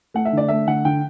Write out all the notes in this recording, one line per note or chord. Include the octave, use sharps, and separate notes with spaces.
A3 F#5
E5
D3 D5
A3 E5
D3 F#5
D3 G5